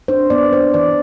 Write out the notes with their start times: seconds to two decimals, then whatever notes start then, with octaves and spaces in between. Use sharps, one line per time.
0.08 D4 C5
0.30 B3 D5
0.52 D4 C5
0.74 E3 D5